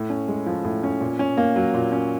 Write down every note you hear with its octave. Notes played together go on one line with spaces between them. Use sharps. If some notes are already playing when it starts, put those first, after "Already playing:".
Already playing: A2
C#4
G#3
F3
A2
C#4
A#2
C#4
A#3
F#3
A#2
C#4